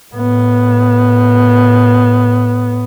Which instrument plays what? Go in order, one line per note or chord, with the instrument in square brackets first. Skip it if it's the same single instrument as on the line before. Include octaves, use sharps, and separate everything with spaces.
[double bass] A2 B3